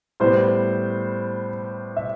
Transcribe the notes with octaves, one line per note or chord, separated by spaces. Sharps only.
A2 G3 B3 C5
E5